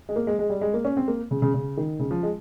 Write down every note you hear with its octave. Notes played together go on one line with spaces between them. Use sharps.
G#3
A#3
G#3
G#3
G3
G#3
A#3
C#4
C4
A#3
C#3
C#3
C#3
D#3
C#3
F3
G#3